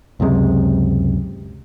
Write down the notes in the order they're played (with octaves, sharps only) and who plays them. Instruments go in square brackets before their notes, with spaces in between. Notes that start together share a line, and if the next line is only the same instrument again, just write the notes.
[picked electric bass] C#2 F#2 C3 G#3